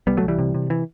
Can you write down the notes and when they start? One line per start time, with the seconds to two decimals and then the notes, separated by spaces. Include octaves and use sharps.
0.07 C2 G3 B3
0.17 F#3 A3
0.23 C2
0.28 E3 G3
0.39 C3
0.54 C3
0.70 E3